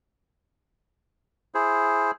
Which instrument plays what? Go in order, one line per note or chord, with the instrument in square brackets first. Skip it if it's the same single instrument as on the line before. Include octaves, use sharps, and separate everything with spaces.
[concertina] E4 G#4 C5